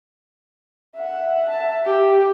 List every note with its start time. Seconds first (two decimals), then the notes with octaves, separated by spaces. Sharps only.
0.95 E5 F#5
1.50 E5 A5
1.85 G4